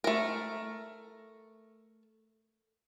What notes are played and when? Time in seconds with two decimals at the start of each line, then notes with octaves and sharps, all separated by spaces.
0.04 A3 A#4